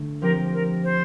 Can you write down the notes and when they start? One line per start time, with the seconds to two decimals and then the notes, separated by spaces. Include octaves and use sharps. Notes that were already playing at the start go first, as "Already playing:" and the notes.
Already playing: D3 A3 D4
0.22 F3 C4 G4 A#4
0.53 A#4
0.84 C5